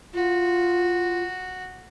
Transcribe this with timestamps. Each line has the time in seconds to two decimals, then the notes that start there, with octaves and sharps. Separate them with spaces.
0.14 F4 F#4